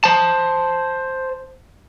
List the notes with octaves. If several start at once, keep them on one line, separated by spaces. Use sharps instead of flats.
C5 A5